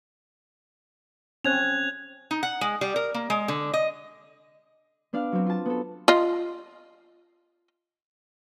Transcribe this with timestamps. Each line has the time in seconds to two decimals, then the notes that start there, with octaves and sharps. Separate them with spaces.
1.44 C4 C#4 F#6 G#6 F7
2.31 D#4
2.43 F#5
2.61 G#3
2.81 G3
2.96 A#4
3.14 A#3
3.30 G#3
3.48 D3
3.74 D#5
5.13 B3 D4 D5 F5
5.32 F#3 C4
5.46 F4 A5
5.66 B3 A4
6.08 F4 D#5